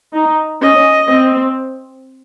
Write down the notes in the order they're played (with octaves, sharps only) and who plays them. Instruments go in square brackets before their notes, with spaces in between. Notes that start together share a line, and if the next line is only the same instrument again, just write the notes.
[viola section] D#4
[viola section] C#4 [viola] D#5
[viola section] C4